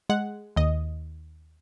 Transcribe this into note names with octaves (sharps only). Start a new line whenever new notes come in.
G#3 F#5
D#2 D#5